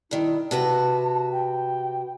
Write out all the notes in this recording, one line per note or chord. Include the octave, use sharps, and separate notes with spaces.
G2 D#3 E4
C3 F#4 B4 A5
G5